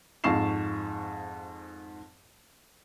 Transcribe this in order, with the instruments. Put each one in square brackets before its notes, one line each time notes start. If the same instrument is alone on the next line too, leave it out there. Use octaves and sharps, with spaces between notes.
[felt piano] F2 G#2 F5 C#6 C7 E7